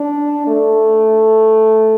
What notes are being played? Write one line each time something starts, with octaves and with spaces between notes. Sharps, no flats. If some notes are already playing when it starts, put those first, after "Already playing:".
Already playing: D4
A3